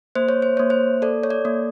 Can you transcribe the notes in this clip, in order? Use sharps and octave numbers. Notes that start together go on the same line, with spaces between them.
A#3 C5
C#5
C5
A#3 C#5
C5
A4 D5
C#5
D5
A#3